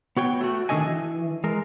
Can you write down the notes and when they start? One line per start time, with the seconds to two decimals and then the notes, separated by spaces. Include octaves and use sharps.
0.17 B3 F#4 C#5 G5
0.41 A3 F#4
0.69 D#3 G3 D4 A4 D#5 G#5
0.86 E3
1.44 G#3 A#4